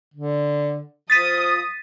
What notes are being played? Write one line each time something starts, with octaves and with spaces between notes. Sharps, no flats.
D3
F3 D#6 A6 B6 D#7